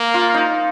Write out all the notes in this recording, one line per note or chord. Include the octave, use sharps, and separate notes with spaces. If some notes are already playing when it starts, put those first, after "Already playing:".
Already playing: A#3
F4
D#4